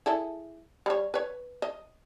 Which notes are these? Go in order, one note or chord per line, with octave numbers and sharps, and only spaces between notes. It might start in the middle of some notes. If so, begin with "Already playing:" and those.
E4 G#4 A4
G3 C#5
B4 C#5
D#5